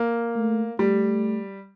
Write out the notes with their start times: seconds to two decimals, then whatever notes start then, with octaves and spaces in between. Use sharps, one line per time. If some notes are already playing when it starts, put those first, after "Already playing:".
Already playing: A#3
0.36 A3
0.79 G3 A3